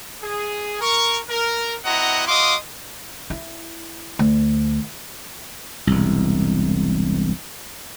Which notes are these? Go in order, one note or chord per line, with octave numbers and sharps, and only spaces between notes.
G#4
A#4 C#6
A#4
C4 E4 F#4 D#5 F#5 A#5
F#4 D#5 F5 C6 D6 D#6
E4
D2
E1 C2